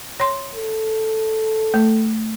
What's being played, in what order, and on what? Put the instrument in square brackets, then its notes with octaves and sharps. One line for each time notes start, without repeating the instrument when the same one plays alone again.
[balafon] C#5 C6
[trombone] A4
[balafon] A3